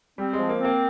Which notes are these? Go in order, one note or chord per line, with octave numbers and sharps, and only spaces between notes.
G3 C4
G#3
F3
A#3
C4
A#3